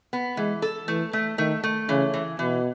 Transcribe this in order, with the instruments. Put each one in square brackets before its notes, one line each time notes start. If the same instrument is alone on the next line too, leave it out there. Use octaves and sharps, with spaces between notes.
[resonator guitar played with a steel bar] B3
[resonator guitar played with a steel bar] E3 [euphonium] G#3
[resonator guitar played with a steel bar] A4
[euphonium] E3 [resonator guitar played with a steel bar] A3
[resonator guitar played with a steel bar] A3
[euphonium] D#3 [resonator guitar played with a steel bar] A3
[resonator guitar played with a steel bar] A3
[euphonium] C#3 [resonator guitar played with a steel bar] E3
[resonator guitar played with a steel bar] E3
[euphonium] B2 [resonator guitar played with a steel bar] E3